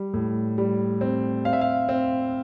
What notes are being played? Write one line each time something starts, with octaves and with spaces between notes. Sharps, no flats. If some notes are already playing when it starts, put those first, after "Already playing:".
Already playing: G3
A2
G3
C4
C4 F5
E5
F5
C4